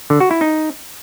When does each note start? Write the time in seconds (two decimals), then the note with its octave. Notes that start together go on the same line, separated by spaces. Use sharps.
0.10 D3
0.20 F#4
0.31 E4
0.41 D#4